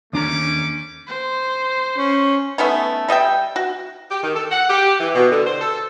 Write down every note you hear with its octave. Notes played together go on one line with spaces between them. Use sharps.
D#2 A3 C#4 D4 A#5 D6
C5
C#4
A3 B3 C#4 D#4
G3 D#5 E5 G5
F#4
G4
D#3
A4
F#5
G4
E3
B2
D3
C5
A4